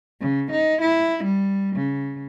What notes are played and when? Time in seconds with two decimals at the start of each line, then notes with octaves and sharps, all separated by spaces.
0.21 C#3
0.52 D#4
0.82 E4
1.24 G3
1.76 C#3